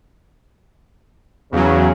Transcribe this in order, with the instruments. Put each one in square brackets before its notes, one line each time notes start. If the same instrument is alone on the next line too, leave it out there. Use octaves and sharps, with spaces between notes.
[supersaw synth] E2 F#3 [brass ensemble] C#3